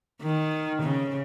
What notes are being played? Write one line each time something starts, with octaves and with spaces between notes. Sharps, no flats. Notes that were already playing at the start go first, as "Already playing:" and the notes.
D#3
C#3